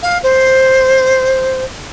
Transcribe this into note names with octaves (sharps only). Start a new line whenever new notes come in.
F5
C5